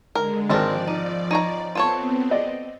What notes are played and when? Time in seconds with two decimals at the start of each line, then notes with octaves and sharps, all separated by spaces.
0.15 D3 G#3 A#4
0.50 G#1 F3 C4 D4 A#4 D5 A5
0.87 D#4
1.31 D#4 C#5 A#5
1.75 B3 C4 F4 A4 C#5
2.31 D5 D#5